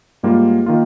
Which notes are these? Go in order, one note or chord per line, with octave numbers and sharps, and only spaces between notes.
G#2 G3 A#3 F4
D#3 A#3 F4